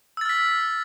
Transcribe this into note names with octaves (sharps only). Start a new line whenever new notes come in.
E6 F6 A6 B6